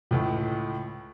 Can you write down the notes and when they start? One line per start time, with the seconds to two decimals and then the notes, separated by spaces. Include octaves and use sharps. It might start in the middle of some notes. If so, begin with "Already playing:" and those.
0.11 C#2 A2